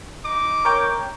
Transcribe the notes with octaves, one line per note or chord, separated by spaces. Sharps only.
D#4 D6
A#4 C#5 G5